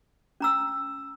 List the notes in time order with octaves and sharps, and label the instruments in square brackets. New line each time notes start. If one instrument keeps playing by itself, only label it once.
[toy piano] C#4 A#5 E6